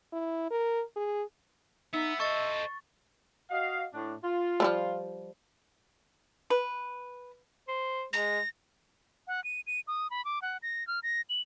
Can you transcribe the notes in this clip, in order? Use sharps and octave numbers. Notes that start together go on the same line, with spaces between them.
E4
A#4
G#4
B3 D#4 E5
A4 C5 D#5 C#6 A6
F#4 D#5 F5
A2 D4
F4
F3 G3 A3
B4
C5
G#3 A#6
F#5
D#7
D#7
D#6
B5
D6
F#5
A#6
F6
A#6
F#7